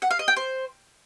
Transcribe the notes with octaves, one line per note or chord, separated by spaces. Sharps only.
F#5
F5
D#5
G5
C5